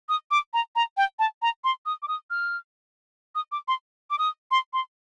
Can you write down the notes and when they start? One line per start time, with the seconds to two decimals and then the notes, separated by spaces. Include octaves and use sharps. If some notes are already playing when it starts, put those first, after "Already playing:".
0.09 D#6
0.31 D6
0.54 A#5
0.76 A#5
0.97 G5
1.19 A5
1.42 A#5
1.64 C6
1.86 D#6
2.02 D6
2.08 D#6
2.30 F6
3.35 D#6
3.52 D6
3.68 C6
4.11 D6
4.19 D#6
4.51 C6
4.73 C6